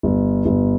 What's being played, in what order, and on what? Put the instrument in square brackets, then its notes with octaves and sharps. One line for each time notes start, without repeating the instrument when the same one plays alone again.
[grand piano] G1
G1